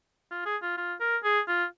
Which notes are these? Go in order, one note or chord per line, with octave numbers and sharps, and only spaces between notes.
F4
G#4
F4
F4
A#4
G#4
F4